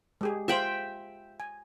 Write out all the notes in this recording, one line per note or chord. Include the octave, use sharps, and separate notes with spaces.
G#3 G4 G#4
F4 C5 E5 G5 B5
G#5